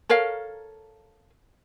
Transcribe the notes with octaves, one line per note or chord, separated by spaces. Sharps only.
A4 A#4 C#5 F5